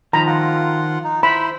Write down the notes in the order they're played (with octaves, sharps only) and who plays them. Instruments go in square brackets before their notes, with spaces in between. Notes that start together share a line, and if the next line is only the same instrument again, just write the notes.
[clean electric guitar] D#3 F3 [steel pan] A#5 [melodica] B5
[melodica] F4 F#5
D#4
[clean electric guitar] E4 [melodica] C5 [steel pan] B5